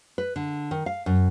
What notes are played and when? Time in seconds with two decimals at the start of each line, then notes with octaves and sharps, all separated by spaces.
0.18 B4
0.36 D3
0.71 D#3
0.86 F5
1.06 F#2